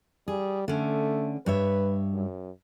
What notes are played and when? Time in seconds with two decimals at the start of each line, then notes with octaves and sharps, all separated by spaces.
0.28 G3 G#4
0.68 D3 A3 C#4
1.46 G2 B4 C#5 E5
2.13 F#2